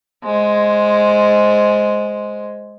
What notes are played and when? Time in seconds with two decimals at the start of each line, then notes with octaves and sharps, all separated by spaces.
0.24 G#3 C5